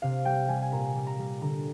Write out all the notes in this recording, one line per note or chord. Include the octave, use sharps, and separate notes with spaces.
C3 F5
G3 G5
G3 G#5
G#5
A#2 A#5
G3
A#5
G3
D3 A#5